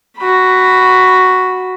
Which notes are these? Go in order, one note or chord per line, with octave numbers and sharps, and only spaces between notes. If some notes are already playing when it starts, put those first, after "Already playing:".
F#4 B5